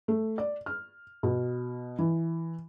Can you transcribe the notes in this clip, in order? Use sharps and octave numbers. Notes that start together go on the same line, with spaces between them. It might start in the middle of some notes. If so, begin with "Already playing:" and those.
A3
D5
F6
B2
E3